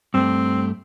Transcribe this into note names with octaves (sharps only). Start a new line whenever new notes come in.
G2 A3 C4